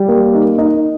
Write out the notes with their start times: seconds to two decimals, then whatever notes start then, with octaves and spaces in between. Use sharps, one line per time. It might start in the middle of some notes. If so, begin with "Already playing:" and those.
Already playing: G3
0.08 A#3
0.34 D#4
0.58 D#4